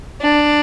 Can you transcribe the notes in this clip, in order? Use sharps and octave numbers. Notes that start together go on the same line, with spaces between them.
D4